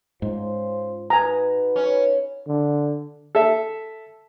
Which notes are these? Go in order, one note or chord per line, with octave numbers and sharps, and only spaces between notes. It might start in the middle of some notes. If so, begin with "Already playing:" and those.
G#2 C#4 F4 C5
D#4 F#4 B4 G#5 A#5
C#4
D3
A4 E5